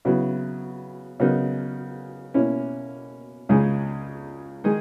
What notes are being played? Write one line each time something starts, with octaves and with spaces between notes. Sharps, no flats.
C#3 F#3 B3 E4
C#3 F#3 B3 D#4 A#4
B2 A#3 C#4 E4
C#2 C#3 G#3 D#4 G#4
D#3 G#3 D#4 G#4